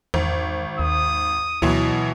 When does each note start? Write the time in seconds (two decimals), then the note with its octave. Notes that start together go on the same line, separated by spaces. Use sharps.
0.14 G#1 E2
0.79 D#2 D#6
1.62 D2 B2 E3 F#3